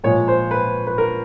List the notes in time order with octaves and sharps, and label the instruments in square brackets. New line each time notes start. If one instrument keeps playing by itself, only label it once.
[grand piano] A#2 F3 G#3 C#5
C5
B4
B4
A#4